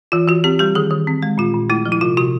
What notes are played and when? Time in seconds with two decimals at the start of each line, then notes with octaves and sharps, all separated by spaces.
0.12 E3 F4
0.28 E3 F#4
0.44 C4 G4
0.59 G3 G4
0.75 D#3 G#4
0.91 D#3
1.07 C4
1.22 G#3
1.38 A#2 F4
1.54 A#2
1.70 A3 E4
1.86 F3
1.92 E4
2.01 C3 F4
2.17 C3 F#4